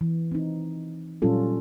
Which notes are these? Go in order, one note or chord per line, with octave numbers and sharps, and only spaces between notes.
E3
C4 D#4
A#2 F#3 G3 C#4 F4 A4